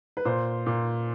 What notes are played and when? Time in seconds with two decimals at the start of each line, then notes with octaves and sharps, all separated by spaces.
0.17 B4
0.25 A#2 C5
0.66 A#2